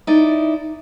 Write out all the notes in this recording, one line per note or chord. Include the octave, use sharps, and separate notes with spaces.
D#4 E4 D5